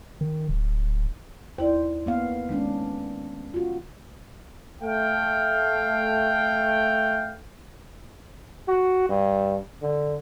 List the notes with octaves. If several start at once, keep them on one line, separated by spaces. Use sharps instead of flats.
D#3
D1
D#2 E4 C5 D5
A#3 B3 F5
D#3 G#3 C#4 D4
F4 F#4
A3 F5 G5
F#4
G2
D3